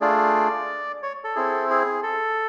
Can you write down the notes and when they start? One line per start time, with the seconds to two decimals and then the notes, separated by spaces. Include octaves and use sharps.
0.01 A3 D4 F4 G#4 D5
1.03 C#5
1.24 A4
1.35 C4 E4 G#4
1.70 G#4
2.03 A4